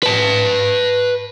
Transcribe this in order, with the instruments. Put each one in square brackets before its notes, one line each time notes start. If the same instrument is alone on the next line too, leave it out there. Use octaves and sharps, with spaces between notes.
[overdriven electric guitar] B4 A5